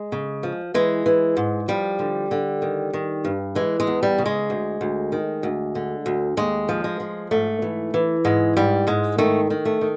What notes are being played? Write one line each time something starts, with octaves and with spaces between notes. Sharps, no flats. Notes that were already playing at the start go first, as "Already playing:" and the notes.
Already playing: G#3
C#3
F3
E3 G#3
E3
G#2
F3 G3
D3
D3
D#3
D#3
G2
E3 G#3
G#3
E2
G3
C#3
G#3
D2
D2
D#3
D2
D3
D2
D#2 G#3
F3
G#3
F3
G#2 A3
E3
E3
G#2 G#3
G#2 G3
G#2 G#3
D#3 A3
D#3
A3
D#3